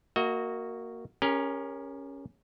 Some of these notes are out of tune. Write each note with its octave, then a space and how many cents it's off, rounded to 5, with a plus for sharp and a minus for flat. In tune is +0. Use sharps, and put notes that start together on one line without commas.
A#3 -10 F#4 +0 D#5 +40
C#4 +0 G4 +45 A#4 +10